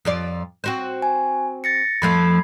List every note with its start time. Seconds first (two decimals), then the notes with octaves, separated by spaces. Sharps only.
0.05 F2 F4 D5
0.64 C4 F#4 C5
1.02 G#5
1.64 A6 A#6 C#7
2.02 F2 F3 A3 B5 G#6 C7